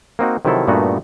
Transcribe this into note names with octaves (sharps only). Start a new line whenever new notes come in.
A#3 C4 D#4 F#4
C3 D#3 F3 F#3 E4 A4
G2 A#2 A3 B3 D#4 F#4